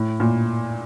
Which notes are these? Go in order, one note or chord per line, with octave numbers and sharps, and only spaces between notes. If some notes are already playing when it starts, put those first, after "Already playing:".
Already playing: A2
A#2